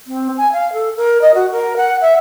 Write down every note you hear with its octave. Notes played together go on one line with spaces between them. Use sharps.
C4
G#5
F5
A4
A#4
D#5
F#4
A#4
F#5
E5